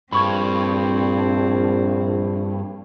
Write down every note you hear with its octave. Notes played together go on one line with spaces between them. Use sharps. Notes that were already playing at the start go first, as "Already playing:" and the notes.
A#1 G2 C4 B5 C#6 G#6